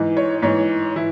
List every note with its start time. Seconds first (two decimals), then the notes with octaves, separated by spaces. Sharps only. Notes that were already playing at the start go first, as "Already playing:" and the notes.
Already playing: G#2 E3
0.17 C#5
0.42 G#2 E3 C#5
0.96 E3 E4